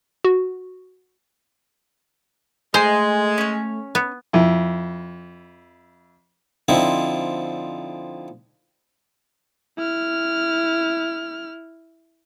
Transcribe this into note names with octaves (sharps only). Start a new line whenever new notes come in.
F#4
G#3 A3 C5 D#5 G#5 C6
C#4 C#5
B3
F2 E4
D3 F3 C4 D#4 E4
E4 F6